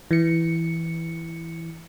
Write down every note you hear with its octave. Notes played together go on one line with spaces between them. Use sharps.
E3 C#7